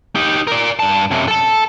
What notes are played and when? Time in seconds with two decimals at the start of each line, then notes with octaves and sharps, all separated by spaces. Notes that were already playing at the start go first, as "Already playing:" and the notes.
0.15 D#4 G4
0.47 A#4 D5
0.79 G2 A5
1.11 F#2 C3
1.28 A4 A5